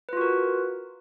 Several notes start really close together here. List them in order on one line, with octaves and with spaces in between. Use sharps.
B4 F4 F#4 A#4